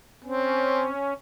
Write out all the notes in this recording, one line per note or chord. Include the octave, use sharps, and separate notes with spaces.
C4 C#4